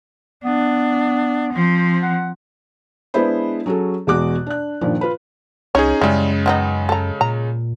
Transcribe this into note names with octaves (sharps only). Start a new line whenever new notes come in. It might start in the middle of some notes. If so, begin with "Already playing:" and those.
B3 D4
F3 C4
F#5
G#3 B3 D4 E4 B4 C5
F#3 C#4 F#4 G#4 A4
E2 B2 G#3 F#4 D6 F#6
D4 F#6
G2 A#2 D#3 F3
F4 B4
C2 C#4 D#4 G#4 C#5
F#2 C#3 G3 G#3 E4
D#3 B3 D#4
A4 A#5
A#2 A#5